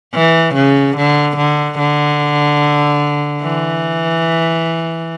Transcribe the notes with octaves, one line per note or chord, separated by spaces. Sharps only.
E3
C#3
D3
D3
D3
E3